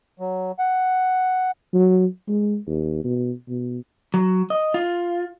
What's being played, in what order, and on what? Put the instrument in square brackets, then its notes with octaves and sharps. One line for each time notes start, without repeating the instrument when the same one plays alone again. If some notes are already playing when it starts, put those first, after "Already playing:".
[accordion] F#3
F#5
[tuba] F#3
G#3
D#2
B2
B2
[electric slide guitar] F#3
D#5
F4